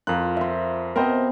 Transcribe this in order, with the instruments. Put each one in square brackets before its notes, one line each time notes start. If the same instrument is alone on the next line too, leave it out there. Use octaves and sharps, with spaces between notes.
[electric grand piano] F2 F#6 [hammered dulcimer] F4 A#4
[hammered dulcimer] C5 E5
[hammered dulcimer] B2 B3 C4 [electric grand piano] A#4 C5 D#5